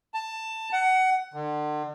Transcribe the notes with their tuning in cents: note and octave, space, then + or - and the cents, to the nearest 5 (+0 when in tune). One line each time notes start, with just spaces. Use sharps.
A5 +15
F#5 +20
D3 +35